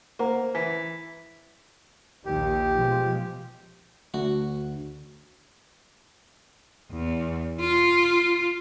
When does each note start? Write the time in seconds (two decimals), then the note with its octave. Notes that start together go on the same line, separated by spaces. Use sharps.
0.19 A#3 C5 F#5 A#5
0.55 E3 B6
2.26 A#1 D#2 D#3 G4
2.79 B2 F3 G#3
4.14 D2 F#4
6.91 E2
7.60 F4